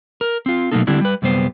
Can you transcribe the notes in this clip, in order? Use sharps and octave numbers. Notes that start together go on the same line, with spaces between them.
A#4
C4 F4
B2 F#3 A3 A#3 D#4 A4
D3 G3 C4 D4 E4 G4
G3 B4
F#2 C3 G3 B3 C5